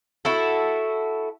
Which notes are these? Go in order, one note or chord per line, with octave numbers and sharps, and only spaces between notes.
E4 F#4 A4